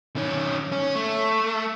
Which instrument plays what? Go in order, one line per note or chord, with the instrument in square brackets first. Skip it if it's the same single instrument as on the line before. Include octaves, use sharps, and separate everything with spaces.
[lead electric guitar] D#3 C#4
C#4
A3